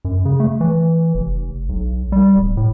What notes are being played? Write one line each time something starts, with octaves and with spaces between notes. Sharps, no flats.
F#2
C#3
A3
E3
F1
B1
G3
D1
A2